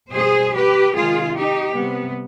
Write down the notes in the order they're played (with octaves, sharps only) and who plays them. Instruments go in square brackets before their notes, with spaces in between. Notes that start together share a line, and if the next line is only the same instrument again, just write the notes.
[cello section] B2 G3 G#4 C5
G4 B4
C3 D#3 G#3 F4 G#4
D#4 G4
C3 G3 B3